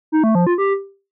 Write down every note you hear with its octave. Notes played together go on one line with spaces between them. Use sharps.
D#4
A3
F3
F4
G4